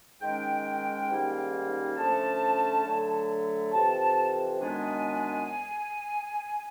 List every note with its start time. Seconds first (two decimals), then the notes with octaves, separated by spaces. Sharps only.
0.20 G#2 D#3 G#3 C#4 G5
1.09 G#2 D#3 G3 A#3 C#4
1.97 D3 F3 A3 C#4 A5
2.84 D3 F#3 A3
3.72 F2 C3 E3 A5
4.60 F#2 D#3 G#3 B3 D4 G#5